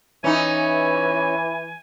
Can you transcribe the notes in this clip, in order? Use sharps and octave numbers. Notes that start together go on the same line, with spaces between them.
E3 C#4 D#4 G#5